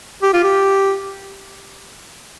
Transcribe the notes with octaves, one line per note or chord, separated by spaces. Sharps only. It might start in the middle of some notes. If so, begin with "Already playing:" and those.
G4
F4
G4